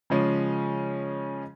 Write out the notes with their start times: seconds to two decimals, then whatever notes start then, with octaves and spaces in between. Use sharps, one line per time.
0.10 C#3 F3 G#3 C#4